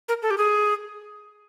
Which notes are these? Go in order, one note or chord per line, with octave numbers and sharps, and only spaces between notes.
A#4
A4
G4
G#4